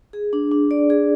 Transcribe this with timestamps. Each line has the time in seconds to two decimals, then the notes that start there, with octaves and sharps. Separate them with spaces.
0.13 G#4
0.33 D4
0.51 D4
0.71 D5
0.90 G#4